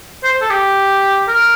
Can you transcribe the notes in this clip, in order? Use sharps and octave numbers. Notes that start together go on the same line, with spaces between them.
C5
A4
G4
A#4